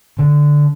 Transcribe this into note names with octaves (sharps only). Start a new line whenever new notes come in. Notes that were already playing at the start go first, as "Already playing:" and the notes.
D3